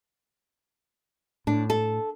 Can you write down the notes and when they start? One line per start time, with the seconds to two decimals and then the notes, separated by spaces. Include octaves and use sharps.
1.47 A2 D4
1.70 A4